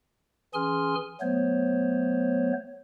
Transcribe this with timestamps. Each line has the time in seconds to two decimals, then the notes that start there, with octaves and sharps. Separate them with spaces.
0.54 E3 C#4 G#4 G#5 C6 F6
1.21 F#3 A3 B3 C5 C#5